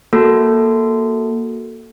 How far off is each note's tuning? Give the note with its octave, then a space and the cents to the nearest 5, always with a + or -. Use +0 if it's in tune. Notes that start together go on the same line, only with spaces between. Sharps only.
A#3 +0 F#4 +0 A4 +0